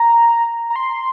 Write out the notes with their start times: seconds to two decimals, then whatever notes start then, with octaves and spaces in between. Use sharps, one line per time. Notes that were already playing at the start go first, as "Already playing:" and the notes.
Already playing: A#5
0.70 A#5
0.76 C6